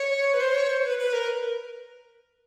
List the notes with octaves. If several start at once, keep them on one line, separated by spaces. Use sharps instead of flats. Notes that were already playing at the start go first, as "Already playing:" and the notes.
Already playing: C#5
B4
C5
C#5
C5
B4
B4
A#4